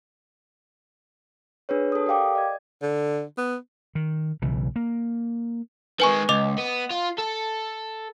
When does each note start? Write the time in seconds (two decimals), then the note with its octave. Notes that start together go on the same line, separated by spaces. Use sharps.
1.69 D4 G#4 B4 C#5
1.92 A4 D#6
2.06 G4 A#4 D5 F5 G5 D6
2.35 D5 D#5 G#6
2.82 D3
3.37 B3
3.95 D#3
4.42 B1 C#3 E3
4.76 A#3
6.00 D#3 G#3 B4 G#5 C#6
6.29 C#2 D#5 D6 F7
6.58 B3
6.91 F4
7.18 A4